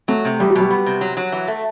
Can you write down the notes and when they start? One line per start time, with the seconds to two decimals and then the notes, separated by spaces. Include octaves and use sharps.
0.08 F#3 A3
0.25 C3
0.40 E2 G3
0.50 F#3
0.55 B2 G3
0.70 B3
0.86 C3
1.01 F#3
1.17 F#3
1.32 E3
1.48 A3